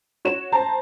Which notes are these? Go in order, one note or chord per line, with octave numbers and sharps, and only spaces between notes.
F#4 C#5 E7
C5 A5 A#5